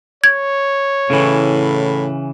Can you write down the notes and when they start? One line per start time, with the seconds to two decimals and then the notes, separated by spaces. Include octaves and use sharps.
0.24 C#5 G#6
1.10 A2 C#3 E3